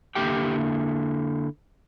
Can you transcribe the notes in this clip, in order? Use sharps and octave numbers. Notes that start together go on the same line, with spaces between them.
D3 A#3 E4 G4 G5